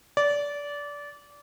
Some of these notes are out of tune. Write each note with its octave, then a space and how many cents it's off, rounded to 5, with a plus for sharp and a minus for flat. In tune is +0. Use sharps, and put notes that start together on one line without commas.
D5 -20